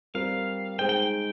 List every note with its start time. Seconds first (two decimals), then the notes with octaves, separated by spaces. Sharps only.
0.14 G3 C4 F4 A#4 F5
0.79 G#3 D#4 G#4 C5 G5
0.89 G5
1.00 G5